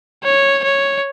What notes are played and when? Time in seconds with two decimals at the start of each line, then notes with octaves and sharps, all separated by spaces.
0.24 C#5
0.64 C#5